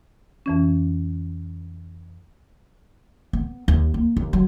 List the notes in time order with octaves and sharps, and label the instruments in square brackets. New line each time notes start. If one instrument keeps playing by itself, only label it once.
[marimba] F2 E3 C#4
[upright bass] B3
D#2
A#3
D#2
F#3